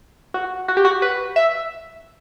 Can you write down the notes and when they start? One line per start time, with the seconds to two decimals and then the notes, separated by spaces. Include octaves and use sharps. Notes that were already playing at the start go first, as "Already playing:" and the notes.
0.34 F#4
0.68 F#4
0.77 G4
0.85 F#4
1.02 B4
1.36 E5